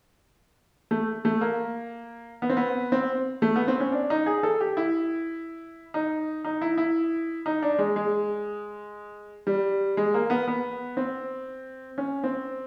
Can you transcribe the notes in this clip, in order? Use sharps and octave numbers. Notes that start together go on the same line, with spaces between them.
A3
A3
A#3
B3
C4
B3
C4
A3
B3
C4
C#4
D4
D#4
G#4
A4
G4
E4
D#4
D#4
E4
E4
D#4
D4
G#3
G#3
G3
G#3
A#3
B3
B3
C4
C#4
C4